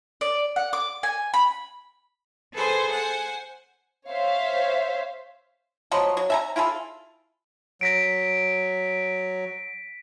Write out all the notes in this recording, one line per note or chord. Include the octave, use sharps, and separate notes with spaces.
D5
F#5
D6
G#5
B5
G#4 A4 B4 C5 G#5
C5 F#5 G#5
C5 C#5 E5 F5
F3 F#3 D#5 C6
F#3
E5 G#5 A#5
E4 F4 G#4 A4
F#3 A#6 B6 D7